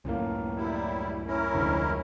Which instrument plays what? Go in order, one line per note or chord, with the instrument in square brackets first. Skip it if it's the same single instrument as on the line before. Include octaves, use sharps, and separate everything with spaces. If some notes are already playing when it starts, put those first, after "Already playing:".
[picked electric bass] C#2 F#2 A2 [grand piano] A#3 C#4
[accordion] F#3 G3 E4
C#4 E4 A#4
[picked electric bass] F1 G#2 [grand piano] D2